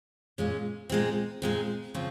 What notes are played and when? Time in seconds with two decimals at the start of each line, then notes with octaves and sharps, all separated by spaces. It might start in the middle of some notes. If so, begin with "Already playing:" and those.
0.38 A#2 G#3 C#4
0.90 A#2 G#3 C4
1.42 A#2 G#3 C4
1.95 C#3 F3 C4